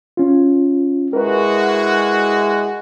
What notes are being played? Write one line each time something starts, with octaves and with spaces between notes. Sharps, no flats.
C#4 F4
G#3 E4 F#4 A#4 B4